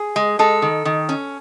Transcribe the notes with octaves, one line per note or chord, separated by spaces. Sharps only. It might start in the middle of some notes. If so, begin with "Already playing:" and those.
Already playing: G#4
G#3
G#3 A4
D#3
D#3
C#4